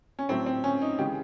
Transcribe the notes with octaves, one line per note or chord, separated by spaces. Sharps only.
C#4
A2 F#3 A3 C4
C4
C#4
D#4
C#3 E3 G#3 G4